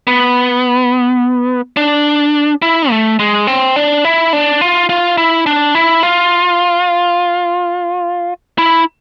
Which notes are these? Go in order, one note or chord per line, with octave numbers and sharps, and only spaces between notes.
B3
D4
E4
A3
G#3
C4
D4
E4
D4
F4
F4
E4
D4
E4
F4
E4